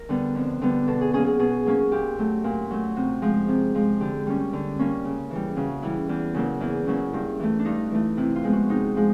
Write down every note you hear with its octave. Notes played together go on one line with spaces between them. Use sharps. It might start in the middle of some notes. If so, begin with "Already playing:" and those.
Already playing: A#4
D3 G3 B3
F2
D3 G3 B3
B2 A4
G#4
F#3 A#3 C#4 G#4
G#4
B2 G#4
F#3 A#3 C#4
A#2 G4
F#3 A3
A#2
F#3 A3
C3 F#4
F3 G#3
C3
F3 G#3
D3 G4
G3 A#3 C#4
D3
G3 A#3 C#4
C#3
E3 G3
C#3 F#4
E3 G3 E4
E2
C#3 F#3 A#3
E2 E4
C#3 F#3 A#3
G2
E3 A3
D4
G2 D#4
E3 A3
C3 E4
F4
F3 G#3 B3
F#4
C3 D#4
F3 G#3